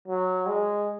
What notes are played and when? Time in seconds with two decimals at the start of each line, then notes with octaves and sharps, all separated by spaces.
0.08 F#3
0.47 G#3